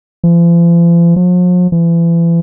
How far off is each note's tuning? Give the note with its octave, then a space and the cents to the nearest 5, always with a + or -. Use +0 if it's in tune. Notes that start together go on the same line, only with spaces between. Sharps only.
F3 -45
F3 +45
E3 +35